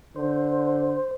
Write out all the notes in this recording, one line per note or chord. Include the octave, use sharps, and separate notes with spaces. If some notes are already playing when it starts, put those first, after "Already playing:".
D3 C5